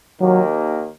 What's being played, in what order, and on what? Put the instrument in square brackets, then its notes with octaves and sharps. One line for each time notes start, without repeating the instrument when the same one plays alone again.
[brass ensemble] D#2 D#3 A#3 [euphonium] F#3